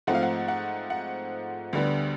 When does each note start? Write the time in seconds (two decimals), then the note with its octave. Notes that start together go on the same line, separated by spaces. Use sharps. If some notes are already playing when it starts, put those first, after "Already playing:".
0.07 G#2 F3 A3 C4 F#5
0.15 F5
0.23 F#5
0.48 F#5
0.90 F#5
1.73 D2 D3 G3 B3